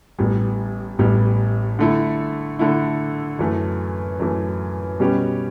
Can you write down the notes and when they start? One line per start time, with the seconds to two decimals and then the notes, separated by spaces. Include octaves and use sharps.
0.18 A1 A2 G3 B3
0.99 A1 A2 G3 B3
1.79 D3 A3 E4
2.59 D3 A3 E4
3.39 F#2 E3 A3
4.20 F#2 E3 A3
5.00 B2 G3 C#4 G4 B4